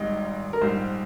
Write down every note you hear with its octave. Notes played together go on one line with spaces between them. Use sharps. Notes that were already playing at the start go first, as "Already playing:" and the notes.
Already playing: G#1 G#2 G3 D#5
A#4
A#1 G#2 G3 C5